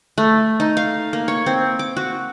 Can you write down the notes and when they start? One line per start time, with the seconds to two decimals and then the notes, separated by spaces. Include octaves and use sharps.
0.18 A3
0.60 D#4
0.77 F5
1.13 A#3
1.28 C#5
1.46 C4
1.79 D6
1.97 F#4